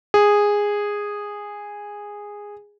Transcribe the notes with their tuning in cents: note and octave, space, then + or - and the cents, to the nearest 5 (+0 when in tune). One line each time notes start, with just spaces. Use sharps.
G#4 -10